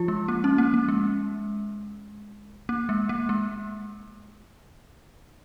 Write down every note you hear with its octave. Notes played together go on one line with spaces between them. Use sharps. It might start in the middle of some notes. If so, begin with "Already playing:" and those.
Already playing: F3 F4
G#3
A#3
C#4
A#3
A#3
G#3
A#3
G#3
A#3
G#3